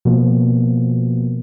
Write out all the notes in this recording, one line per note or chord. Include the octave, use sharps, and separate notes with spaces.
B2 F3 A#3